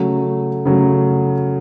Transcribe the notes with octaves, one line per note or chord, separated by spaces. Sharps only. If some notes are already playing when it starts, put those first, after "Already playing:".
Already playing: C#3 F#3 A3
C#3 F#3 A3